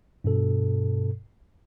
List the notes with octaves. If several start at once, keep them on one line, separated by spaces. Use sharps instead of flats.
G2 B2 A4